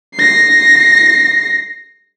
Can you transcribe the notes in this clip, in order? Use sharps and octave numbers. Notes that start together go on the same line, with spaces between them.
A#6 C7